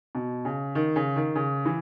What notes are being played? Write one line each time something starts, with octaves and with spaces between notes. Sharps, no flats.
B2
C#3
D#3
C#3
D#3
C#3
E3